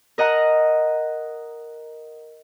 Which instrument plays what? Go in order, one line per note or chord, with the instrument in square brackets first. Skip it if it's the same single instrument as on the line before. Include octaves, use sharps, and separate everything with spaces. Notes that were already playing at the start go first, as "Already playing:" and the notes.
[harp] A#4 D#5 F#5 A#5 F#6